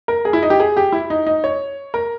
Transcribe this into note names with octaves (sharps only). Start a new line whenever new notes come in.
A#4
G#4
E4
D#4
G4
G#4
G4
E4
D#4
D#4
C#5
A#4